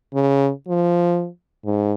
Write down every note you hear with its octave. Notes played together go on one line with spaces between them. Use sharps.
C#3
F3
G#2